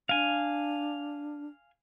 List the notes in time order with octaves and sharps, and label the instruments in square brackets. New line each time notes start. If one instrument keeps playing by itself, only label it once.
[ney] D4 [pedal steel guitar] F5 G#5